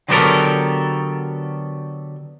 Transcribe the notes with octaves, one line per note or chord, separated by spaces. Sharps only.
D3 F#3 B3 G4 A4 A#4